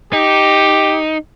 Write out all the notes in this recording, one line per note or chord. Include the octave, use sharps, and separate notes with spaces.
D#4 G4